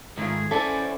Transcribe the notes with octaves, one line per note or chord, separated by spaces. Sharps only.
G#2 D#3 A3 F4 G#4
C#4 E4 A4 C5 D5 E5 F#5 G#5